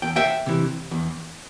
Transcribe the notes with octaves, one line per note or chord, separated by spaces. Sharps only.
E2 G5
E5 G5
C3 E3
E2